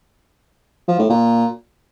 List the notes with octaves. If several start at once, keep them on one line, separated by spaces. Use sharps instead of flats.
F3
A2
A#2